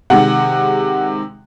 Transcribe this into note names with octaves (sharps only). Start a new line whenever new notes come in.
C3 D#3 G#3 F#5